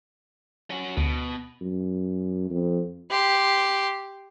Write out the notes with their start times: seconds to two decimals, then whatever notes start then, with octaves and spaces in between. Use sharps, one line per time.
0.70 C#4 F#4
0.97 D2 B2
1.61 F#2
2.50 F2
3.11 G4 C6